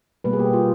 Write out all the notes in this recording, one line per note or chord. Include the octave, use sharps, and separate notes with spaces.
B2 G3 A#3 B4
G#4
G4
F4